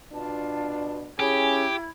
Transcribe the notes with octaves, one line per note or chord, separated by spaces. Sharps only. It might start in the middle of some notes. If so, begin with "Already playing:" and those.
B2 D4 F4 A5
C#4 E4 G4 G#4 B5 G#6